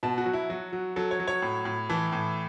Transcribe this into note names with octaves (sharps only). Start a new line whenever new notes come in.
B2 A5
F#4
F#3
E4
F#3 F#4
F#3
F#3 A4
C#5
F#3
C#5
A2
A2
E3 A5
A2